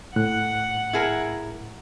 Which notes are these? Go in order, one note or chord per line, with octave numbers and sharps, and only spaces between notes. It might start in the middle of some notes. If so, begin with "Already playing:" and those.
A2 F#5 F#6
E4 G#4 A#4